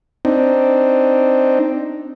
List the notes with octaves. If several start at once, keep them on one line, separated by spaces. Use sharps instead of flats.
C4 D4 D#4